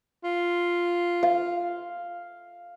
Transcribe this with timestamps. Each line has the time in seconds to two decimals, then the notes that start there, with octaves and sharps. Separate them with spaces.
0.24 F4
1.23 F5